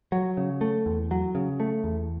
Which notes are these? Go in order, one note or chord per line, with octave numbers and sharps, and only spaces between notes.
F#3
C#3
A3
E2
F#3
C#3
A3
E2